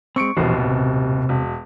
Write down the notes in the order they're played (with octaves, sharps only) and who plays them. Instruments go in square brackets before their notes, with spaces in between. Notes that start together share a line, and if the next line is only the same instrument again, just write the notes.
[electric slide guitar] G#3 C4 [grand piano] C#6 C#7 D7
[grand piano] D#1 A1 B2 [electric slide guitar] E3 F3 C5
[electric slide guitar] C3
[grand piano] E1